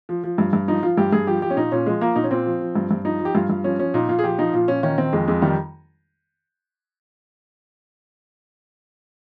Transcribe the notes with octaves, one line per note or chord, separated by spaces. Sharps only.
F3
F3
G2
G2
F3 D#4
F3 F4
G2 G4
G2 G#4
F3 G4
F3 G4
C#4
A#2 D#4
A#2 C#4
F3 G#3
F3 A#3
A#2 D#4
C#4
A#2 C4
F3
F3
G2
G2
F3 D#4
F3
G4
G2 F4
G2
F3 C#4
F3 C#4
A#2 D#4
A#2 F4
G#4
F3 G4
F3 D#4
A#2 F4
A#2 C#4
D#3 C#4
D#3 C4
F2 G#3
F2 G#3
D#3 G3